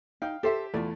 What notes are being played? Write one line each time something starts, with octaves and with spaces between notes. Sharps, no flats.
D#4 F5 G5
G4 A4 C5 E5
E2 A3 E4 F4 D5